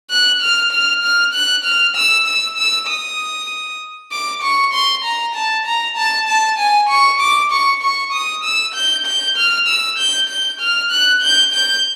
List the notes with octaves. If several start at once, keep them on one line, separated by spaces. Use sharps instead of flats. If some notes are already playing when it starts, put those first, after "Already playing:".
F#6
F6
F6
F6
F#6
F6
E6
E6
E6
D#6
D6
C#6
C6
A#5
A5
A#5
A5
A5
G#5
C#6
D6
C#6
C#6
D#6
E6
G6
G6
F6
E6
G6
G6
F6
F#6
G6
G6